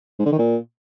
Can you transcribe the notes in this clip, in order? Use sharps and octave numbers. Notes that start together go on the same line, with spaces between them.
G#2
D3
D#3
A#2